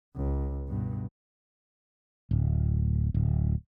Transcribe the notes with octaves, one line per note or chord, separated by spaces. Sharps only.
C#2
G2 B2
D1
D1